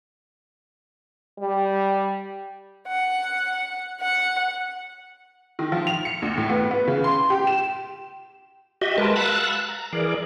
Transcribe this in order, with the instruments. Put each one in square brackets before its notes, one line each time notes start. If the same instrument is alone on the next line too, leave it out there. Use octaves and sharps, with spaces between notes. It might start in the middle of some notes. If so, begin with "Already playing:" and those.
[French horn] G3
[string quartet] F#5
F#5
[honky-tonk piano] D#3
F3
F7
C#7
D2
A2
B3
B3
C#3
C6
G4
E7
[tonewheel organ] F#4 G4 D#5 E5
G#3 A#4 B4 A5
F5 F#5 A5 B5 E6 F#6
A#5
E3 G#4 A#4 D5